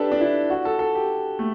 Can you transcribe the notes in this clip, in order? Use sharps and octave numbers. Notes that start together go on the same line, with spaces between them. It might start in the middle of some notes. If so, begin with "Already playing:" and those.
Already playing: D4 G4 A4 B4
D4
E4
F#4
A4
A4
G4
A3